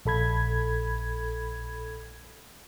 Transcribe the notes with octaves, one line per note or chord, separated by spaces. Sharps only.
A#1 A4 B5 G#6